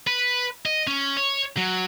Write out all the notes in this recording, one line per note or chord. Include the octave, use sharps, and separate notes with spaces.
B4
D#5
C#4
C#5
F#3